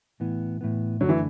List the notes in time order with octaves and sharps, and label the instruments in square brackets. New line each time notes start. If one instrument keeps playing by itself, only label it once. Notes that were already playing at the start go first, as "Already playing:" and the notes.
[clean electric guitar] A2 E3 B3
A2 E3 B3
[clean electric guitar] F#2 D3 A3 D4 [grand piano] F#3
[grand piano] E3